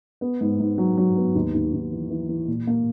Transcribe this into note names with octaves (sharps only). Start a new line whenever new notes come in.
B3
G#2
G#2
F#3
F#3
B3
D#2
D#2
D#2
E3
E3
E3
A#2
A#3